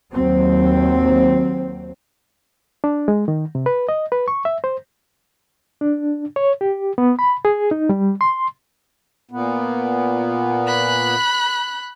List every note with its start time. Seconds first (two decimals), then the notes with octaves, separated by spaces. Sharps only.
0.11 D#2 F#3 C4
2.84 D4
3.08 G#3
3.28 D#3
3.55 C3
3.66 B4
3.89 D#5
4.12 B4
4.28 C#6
4.45 E5
4.64 C5
5.81 D4
6.36 C#5
6.61 G4
6.98 B3
7.19 B5
7.45 G#4
7.71 D#4
7.89 G3
8.21 C6
9.31 A#2 B3
10.67 B5 F#6